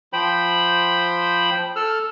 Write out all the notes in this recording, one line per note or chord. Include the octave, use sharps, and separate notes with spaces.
F3 C5 G5 B5
A4 E6 F6